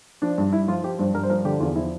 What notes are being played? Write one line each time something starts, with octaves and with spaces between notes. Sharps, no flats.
F3 D4
G2
G2 E4
F3 F4
F3 G4
G2 C5
G2 A#4
C5
F3 A#4
D3 G4
E2 F4
F3 E4